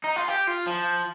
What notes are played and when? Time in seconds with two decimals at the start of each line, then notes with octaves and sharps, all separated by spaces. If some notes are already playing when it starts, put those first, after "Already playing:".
0.04 D#4
0.16 F4
0.28 G4
0.47 F4
0.67 F3